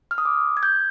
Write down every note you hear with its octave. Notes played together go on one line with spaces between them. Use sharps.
F6
D#6
D6
G#6
G6